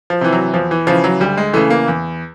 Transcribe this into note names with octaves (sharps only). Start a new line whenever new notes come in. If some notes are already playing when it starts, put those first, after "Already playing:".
F3
C3 E3
F#3
E2 F3
E3
C#3 E3 F3
F#3
D2 G3
G#3
C#3 E3 A3
A#3
E2